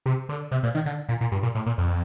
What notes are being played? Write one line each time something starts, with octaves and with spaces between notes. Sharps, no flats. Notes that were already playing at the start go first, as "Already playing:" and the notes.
C3
D3
C3
A#2
D#3
D3
A#2
A#2
G2
A#2
A2
A#2
F2